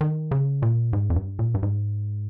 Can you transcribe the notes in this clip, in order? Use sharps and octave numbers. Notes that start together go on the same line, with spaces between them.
D#3
C#3
A#2
G#2
F2
G2
A#2
G2
G#2